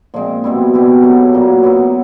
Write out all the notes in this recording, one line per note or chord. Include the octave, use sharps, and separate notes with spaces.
A#2 F3 G#3 C4
B2 G3 C4 E4
G3 B3 E4 G4
F#3 A3 C#4
A#2 F#3 A#3
F#3 B3 E4